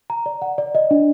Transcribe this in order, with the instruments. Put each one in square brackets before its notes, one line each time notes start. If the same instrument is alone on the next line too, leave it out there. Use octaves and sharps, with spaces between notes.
[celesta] A#5
D5
F#5
D5
D#5
D4